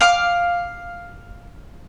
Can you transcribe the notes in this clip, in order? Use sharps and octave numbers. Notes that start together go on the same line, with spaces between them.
F5 D6